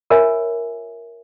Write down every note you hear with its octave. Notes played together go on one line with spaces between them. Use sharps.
F4 A#4 C#5 E5 G#5